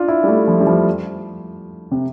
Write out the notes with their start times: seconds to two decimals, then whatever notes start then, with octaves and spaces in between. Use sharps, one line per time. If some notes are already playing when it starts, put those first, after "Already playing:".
Already playing: D4 F4
0.08 E4
0.23 G3
0.28 A3
0.48 F3
0.60 G3
0.67 F3
1.91 C3